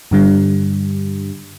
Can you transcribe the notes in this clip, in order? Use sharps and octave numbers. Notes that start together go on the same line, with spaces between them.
G2 D3 G3